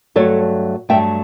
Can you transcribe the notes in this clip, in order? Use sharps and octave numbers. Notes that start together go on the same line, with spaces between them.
G2 F#3 A3 A4 C#5
G2 F#3 A3 E5 G5